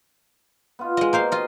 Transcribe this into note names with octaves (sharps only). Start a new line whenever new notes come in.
B3 F4
G#3 D#5
B2 A#3 C5 F5 G5 A#5
F4 D#5